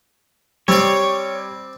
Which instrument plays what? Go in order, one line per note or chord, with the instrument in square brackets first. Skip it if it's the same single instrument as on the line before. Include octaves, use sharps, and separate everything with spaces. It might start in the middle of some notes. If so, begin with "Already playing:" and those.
[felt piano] G3 [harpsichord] C4 D5 [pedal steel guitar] C#5